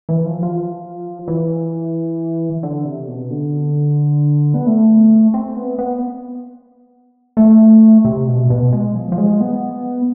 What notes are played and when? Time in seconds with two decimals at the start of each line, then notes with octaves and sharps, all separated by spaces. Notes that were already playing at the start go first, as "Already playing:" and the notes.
0.09 E3
0.26 F3
0.43 F3
1.28 E3
2.63 D3
2.85 C3
3.08 B2
3.30 D3
4.54 B3
4.67 A3
5.34 C4
5.56 B3
5.79 B3
7.37 A3
8.05 C3
8.27 B2
8.50 B2
8.73 G#3
8.95 F3
9.12 F3
9.18 G#3
9.41 B3